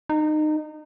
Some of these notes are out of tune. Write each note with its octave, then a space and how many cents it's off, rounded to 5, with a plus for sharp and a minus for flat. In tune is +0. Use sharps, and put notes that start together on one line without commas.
D#4 -25